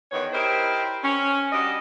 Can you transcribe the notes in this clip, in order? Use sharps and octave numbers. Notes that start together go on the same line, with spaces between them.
E2 D#3 B3 C#5
E4 G4 A#4 C5 D#5
C#4
G3 D4 F#4 D#5